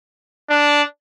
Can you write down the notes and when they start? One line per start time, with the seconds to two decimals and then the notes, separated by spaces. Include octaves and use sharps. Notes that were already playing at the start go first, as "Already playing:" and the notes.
0.49 D4